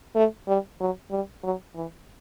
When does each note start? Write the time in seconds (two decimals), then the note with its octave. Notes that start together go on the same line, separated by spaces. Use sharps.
0.16 A3
0.48 G3
0.80 F#3
1.11 G3
1.44 F#3
1.75 E3